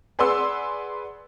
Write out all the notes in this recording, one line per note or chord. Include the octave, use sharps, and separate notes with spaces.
G#4 B4 D5 F#5 C6 E6